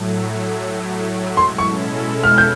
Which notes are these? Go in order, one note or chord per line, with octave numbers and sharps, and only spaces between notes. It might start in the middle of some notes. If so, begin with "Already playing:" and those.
Already playing: A2 F#3 A3
B2 G#3 C#4 E4 A4 C6
C#6
F6
G6